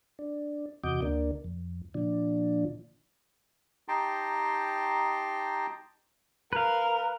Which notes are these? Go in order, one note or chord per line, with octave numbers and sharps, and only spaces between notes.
D4
E2 C3 F#4 D#5 D6 G6
D2 A#3 D4
F2
A#2 D3 F3 D4
D#4 G4 G5 A5 A#5 C6
A#4 B4 F5